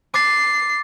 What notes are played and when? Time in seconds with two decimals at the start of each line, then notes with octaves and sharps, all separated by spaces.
0.14 D6 A6 C7